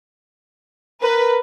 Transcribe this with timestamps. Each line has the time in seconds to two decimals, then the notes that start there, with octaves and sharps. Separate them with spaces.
1.03 A#4 B4